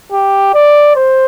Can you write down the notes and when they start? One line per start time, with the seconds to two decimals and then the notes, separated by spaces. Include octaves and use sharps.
0.12 G4
0.54 D5
0.96 C5